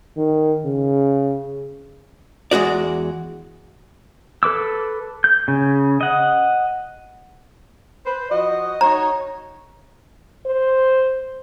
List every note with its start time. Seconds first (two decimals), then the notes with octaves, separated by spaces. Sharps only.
0.17 D#3
0.65 C#3
2.51 E2 G#3 F#4 D5
4.43 A4 B4 D6 E6
5.24 G6
5.48 C#3
6.01 D#5 F#5
8.06 B4 C5
8.30 F3 F#4 D#5
8.81 D#4 F#4 C#5 A#5
10.46 C5